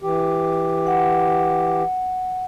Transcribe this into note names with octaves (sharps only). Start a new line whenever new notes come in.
E3 G4
F#5